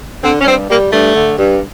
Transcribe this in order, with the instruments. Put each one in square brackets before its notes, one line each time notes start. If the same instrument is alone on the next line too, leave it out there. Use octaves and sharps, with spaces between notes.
[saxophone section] D3 C4
C#4
G2 C4
G3 A#3
G2 A3
D3
G2